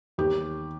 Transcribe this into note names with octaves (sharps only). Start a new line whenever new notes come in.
D#2 G4